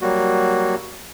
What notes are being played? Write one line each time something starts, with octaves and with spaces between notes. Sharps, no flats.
F#3 G3 A#3 F#4